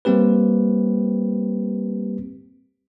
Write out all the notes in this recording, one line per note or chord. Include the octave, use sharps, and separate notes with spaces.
G3 A#3 C4 G4 B4